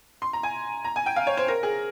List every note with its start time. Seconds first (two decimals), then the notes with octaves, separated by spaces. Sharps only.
0.22 C6
0.33 A#5
0.43 G#5
0.85 A#5
0.96 G#5
1.06 G5
1.16 F5
1.27 C#5
1.37 C5
1.48 A#4
1.63 G#4